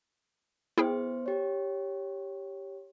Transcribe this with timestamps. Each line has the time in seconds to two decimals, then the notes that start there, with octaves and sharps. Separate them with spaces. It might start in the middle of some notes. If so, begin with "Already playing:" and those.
0.78 B3 E4 G#4 C5 G5
1.26 G4 C#5